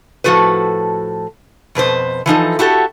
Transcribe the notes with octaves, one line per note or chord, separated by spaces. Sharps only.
A2 F3 F#4 A4 B4
F2 B2 B4 C5
E3 F3 D#4 A4
E4 F#4 G4 A4